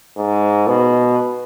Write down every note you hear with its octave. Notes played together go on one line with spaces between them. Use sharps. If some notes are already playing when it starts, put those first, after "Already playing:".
G#2
B2